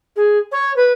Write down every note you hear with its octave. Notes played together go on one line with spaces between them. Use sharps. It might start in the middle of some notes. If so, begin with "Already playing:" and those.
G#4
C#5
B4